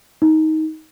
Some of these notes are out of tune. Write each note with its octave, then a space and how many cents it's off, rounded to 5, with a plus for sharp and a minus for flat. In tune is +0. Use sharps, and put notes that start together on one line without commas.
D#4 +15